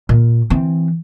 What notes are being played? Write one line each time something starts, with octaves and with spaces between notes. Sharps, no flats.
A#2
E3 C4